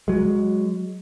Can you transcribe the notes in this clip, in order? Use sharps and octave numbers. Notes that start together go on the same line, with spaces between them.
F#3 G#3